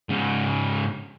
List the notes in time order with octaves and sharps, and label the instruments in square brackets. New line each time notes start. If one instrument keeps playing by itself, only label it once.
[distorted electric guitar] G#2 C#3